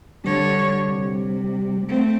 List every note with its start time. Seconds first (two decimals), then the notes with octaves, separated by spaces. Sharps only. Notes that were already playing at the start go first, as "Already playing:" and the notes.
0.24 D3 G3 C#5
0.87 C3
1.86 A3 C4